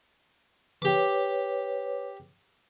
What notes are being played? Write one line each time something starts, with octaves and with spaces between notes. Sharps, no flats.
G4 B4 C#5 D6